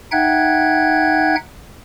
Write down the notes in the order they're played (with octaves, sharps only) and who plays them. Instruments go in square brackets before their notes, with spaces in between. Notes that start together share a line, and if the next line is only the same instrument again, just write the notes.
[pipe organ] D#4 E5 F#5 G5 F#6 G#6